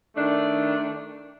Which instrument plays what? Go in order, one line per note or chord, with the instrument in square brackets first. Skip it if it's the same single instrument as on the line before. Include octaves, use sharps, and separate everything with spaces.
[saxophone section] D#3 A3 D4